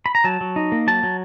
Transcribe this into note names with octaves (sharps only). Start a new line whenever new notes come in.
B5
A#5
F#3 A5
F#3
D#4
A#3
F#3 A5
F#3